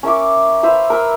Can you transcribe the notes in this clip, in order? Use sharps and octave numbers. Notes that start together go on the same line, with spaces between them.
C#4 A#4 E5 D6
B4 C5 E5 F5
A#4 B4 E6